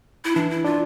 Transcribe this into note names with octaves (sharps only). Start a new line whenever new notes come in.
E4
E3 D4
E4
D4 F4